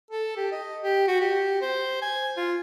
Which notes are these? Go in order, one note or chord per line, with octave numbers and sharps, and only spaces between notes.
A4
G4
D#5
G4
F#4
G4
C5
G#5
F4